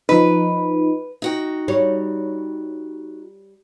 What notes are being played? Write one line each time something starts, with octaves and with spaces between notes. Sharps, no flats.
F3 D#4 B4
D#4 F#4 G5
G3 C#5